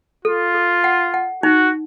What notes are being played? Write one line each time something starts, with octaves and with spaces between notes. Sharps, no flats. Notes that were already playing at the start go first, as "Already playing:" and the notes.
F4 A4
A4
F#5
F#5
D#4 F#4